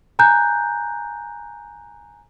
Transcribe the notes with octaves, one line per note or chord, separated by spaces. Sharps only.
G#5 A#5 F#6 G6